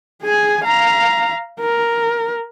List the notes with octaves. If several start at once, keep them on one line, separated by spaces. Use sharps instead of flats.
G#4 G#5
F5 A#5
A#4